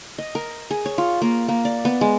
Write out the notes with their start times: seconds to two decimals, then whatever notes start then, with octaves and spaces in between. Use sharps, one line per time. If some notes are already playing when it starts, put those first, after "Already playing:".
0.18 D#5
0.35 A#4
0.71 G#4
0.86 C#5
0.98 F4
1.22 A#3
1.48 A#3
1.65 D5
1.85 B3
2.01 G#3